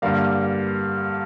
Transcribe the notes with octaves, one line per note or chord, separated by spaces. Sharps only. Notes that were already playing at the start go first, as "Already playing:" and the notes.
G2 D3 G3 A#3 F5